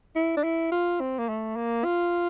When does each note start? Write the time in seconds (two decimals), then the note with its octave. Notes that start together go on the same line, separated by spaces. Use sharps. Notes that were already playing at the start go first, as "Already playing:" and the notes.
0.16 E4
0.37 D4
0.44 E4
0.72 F4
1.00 C4
1.19 A#3
1.29 A3
1.56 A#3
1.84 F4